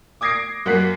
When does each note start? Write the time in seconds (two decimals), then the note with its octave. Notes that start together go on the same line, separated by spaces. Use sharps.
0.21 D6 D#6 G#6 A#6 C7 D7
0.66 F#2 A#3 F#4 F#6 B6 C7